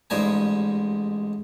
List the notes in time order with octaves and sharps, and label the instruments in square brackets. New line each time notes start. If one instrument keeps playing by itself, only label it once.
[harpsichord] A1 G#2 G3 A#4 G#5